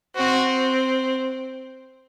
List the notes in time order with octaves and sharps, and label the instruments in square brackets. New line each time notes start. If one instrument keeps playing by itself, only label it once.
[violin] C4 [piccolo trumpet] F#4